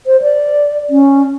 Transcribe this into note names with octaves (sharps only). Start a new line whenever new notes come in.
C5
D5
C#4